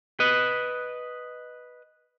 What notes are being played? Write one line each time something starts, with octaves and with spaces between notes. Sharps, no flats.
B4 D#5